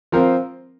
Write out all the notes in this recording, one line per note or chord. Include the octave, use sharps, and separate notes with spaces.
F3 C4 A#4